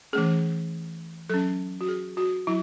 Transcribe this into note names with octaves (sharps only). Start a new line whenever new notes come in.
E3 A3 C#4 G#4
F#3 C#4 A4
F#4
G#4
F#4
F#3 E4